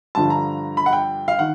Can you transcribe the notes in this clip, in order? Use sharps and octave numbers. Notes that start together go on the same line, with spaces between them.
G2 D3 F3 A5
A#5
B5
F#5
G5
F5
D#3 F#5